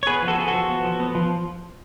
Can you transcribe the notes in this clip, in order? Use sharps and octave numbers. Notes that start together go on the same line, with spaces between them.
C#5
B3 G#4 B4
F3
F#4 A4
B3 G#4
F#4 A4
F3
B3
F3
B3
F3